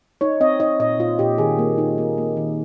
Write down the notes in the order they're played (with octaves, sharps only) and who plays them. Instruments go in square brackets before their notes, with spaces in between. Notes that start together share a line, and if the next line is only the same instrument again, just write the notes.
[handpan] D#4 C#5
C4 D#5
D#4 D#5
A#2 D#5
A#2 F4
A#2 G4
D#3 G#4
A#3
D#4
A#3
A#3
D#3